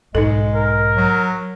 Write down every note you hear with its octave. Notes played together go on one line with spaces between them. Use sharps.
B1 G#2 G#3 D#4 A4
A#4
F#3